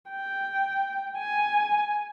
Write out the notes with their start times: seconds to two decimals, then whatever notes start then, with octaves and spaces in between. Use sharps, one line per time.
0.10 G5
1.18 G#5